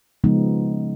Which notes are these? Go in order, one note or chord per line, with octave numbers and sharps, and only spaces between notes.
C#3 F3 G#3 B3 D#4